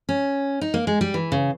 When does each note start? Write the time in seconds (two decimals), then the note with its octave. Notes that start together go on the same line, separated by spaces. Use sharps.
0.09 C#4
0.61 D#4
0.74 A#3
0.87 G#3
1.01 G3
1.14 E3
1.32 C#3